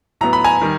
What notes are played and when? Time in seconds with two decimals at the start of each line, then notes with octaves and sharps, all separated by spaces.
0.21 A2 F#3 B3 A#5
0.33 B5
0.44 G#5 A#5
0.62 D#3 G3